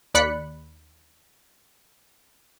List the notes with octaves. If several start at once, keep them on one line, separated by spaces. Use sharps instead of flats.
D#2 D5 B5 F#6 C#7